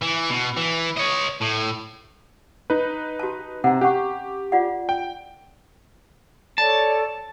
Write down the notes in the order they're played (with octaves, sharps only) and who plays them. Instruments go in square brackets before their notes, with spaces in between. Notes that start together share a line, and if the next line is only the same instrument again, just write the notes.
[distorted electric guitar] E3
B2
E3
C#5 D#5
A2
[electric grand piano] D#4 B4
[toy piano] F#4 A5
[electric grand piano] C3 [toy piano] F#5 A#5
[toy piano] C#4 F#5 C#6 [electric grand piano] G4
[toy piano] F4 D5 F#5
[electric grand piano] G5
[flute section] A4 C#5 D5 [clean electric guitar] A5